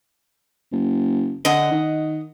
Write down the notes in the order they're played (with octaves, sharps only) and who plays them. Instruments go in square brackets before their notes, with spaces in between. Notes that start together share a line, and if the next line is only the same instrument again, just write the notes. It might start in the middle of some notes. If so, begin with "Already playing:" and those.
[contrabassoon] F#1
[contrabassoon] D3 [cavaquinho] D#5 F#5
[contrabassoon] D#3